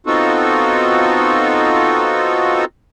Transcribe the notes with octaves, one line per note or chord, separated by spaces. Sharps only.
B3 C4 D#4 F4 F#4 A4